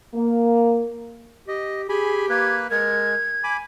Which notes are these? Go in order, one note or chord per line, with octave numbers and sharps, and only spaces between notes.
A#3
G4 D#5
G4 G#4 G#5 B5
A#3 B4 G#6
G#3 A#4 G#6
G#5 B5 D6